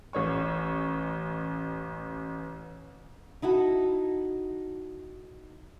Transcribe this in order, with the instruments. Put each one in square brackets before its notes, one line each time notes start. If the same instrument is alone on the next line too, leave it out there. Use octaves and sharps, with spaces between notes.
[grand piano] A1 C#5 C#6
[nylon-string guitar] D#4 E4 F#4 A4